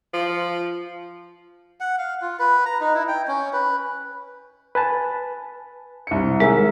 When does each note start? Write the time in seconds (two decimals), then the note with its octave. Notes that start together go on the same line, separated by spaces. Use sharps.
0.13 F3
1.80 F#5
1.98 F5
2.22 F4
2.39 B4
2.66 A#5
2.80 D#4
2.95 E4
3.08 G5
3.27 C#4
3.53 B4
4.75 B4 G#5 A5
6.07 C2 C#7
6.40 D#2 G#3 G#4 A#4 E5